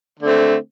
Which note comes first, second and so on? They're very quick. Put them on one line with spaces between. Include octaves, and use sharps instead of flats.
D3 A3 C4